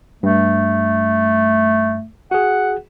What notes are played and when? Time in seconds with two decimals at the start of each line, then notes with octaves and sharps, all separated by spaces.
0.23 G2 A3
2.31 F#4 G#4 F#5